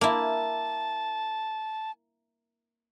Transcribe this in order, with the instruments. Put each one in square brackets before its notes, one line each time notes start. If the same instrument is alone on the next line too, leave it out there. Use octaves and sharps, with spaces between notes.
[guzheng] A#3 E4 [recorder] A5